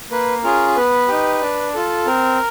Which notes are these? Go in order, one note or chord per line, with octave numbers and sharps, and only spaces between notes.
A#3 B4
C#4 F4 G#4 A#4
B3 B4
D#4 G4
D4
F4 A4
C4 A#4